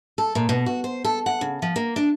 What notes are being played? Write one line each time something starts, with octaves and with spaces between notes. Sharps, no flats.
A4
A#2
B2
F#4
C5
A4
F#5
C#3
F3
A#3
D4